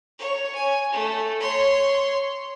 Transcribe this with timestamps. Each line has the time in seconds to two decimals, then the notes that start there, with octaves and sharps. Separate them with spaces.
0.19 C#5
0.54 G#5
0.92 A3
1.40 C#5 C6